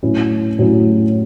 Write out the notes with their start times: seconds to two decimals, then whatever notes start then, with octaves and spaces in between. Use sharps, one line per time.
0.03 A2 F#3 C#4 E4
0.59 A2 F#3 C#4 E4